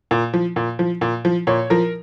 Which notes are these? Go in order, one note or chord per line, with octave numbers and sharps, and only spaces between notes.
A#2
F3
A#2
F3
A#2
F3
A#2 C#5
F3 A#4